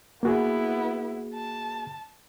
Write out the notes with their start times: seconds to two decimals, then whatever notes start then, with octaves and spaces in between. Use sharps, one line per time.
0.23 A#3 B3 E4 F#4 G#4
1.34 A5